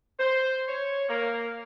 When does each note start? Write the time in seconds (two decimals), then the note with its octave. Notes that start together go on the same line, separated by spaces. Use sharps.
0.19 C5
0.68 C#5
1.09 A#3